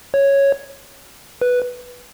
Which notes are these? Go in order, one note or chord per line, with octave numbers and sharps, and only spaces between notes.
C#5
B4